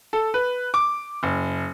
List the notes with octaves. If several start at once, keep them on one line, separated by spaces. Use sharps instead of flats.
A4
B4
D6
F#1